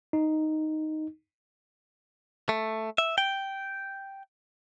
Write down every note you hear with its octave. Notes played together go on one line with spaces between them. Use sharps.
D#4
A3
E5
G5